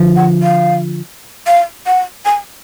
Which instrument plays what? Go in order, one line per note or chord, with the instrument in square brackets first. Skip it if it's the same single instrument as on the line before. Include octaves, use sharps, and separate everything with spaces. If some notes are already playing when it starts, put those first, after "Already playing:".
Already playing: [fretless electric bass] D3 F3
[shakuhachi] F#5
F5
F5
F#5
G#5